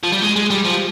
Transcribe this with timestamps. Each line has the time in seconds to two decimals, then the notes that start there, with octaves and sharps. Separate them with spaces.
0.03 F3
0.12 G3
0.22 G#3
0.36 G#3
0.50 G3
0.65 F3